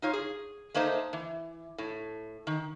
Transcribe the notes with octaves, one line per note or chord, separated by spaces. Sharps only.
D#4 F4 C#5
G#4
A3 A#3 D#4 C5 D#5
E3
A2
D#3